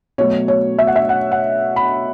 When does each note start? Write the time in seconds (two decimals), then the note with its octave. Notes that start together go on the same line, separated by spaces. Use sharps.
0.18 B2 F#3 A3 C#5
0.48 C#5
0.79 E5
0.87 F#5
0.96 E5
1.09 F#5
1.32 F#5
1.76 B5